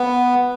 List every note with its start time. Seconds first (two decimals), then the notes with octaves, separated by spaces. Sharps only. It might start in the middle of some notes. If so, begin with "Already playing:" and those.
Already playing: B3